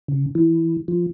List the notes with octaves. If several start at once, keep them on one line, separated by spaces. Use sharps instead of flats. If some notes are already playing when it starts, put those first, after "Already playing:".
C#3
E3
F3